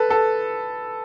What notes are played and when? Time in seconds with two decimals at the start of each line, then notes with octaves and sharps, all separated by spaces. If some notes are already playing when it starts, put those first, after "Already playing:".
Already playing: A4 B4
0.10 A4